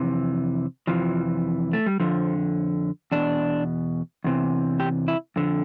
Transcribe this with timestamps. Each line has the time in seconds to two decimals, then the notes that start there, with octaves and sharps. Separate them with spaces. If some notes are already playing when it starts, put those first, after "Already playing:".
Already playing: F2 C3 E3
0.87 F2 C3 E3 F3
1.73 A3
1.86 G3
2.00 F2 D3 F3
3.12 E2 B2 D4
4.24 E2 C3 E3
4.80 G4
5.08 E4
5.36 F2 D3